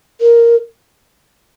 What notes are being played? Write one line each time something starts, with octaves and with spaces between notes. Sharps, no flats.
A#4